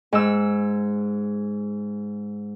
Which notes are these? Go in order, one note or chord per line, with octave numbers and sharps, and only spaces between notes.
G#2 E6